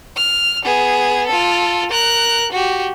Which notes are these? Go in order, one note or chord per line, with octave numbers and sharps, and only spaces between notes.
F6
B3 G#4
F4 A4
A#4 F#6
F#4 G4